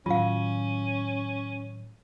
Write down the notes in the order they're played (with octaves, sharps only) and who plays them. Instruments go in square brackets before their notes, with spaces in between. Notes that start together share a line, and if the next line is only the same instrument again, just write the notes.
[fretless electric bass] A2 D#3 F#3 [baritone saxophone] C#4 [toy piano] F4 F5